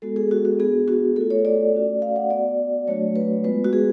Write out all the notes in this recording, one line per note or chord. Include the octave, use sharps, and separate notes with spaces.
G#3 B3 F#4 A4
G#4
F#4
F#4
B3 D4 F#4 G#4
F#4
A3 F4 A4
C#5
D5
A3 C#4 F#4
F5
F#5
B3 F#4 D5
F#3 A3 D4 F#4 C#5
B4
G#3 B3 F4 B4
F#4
G#4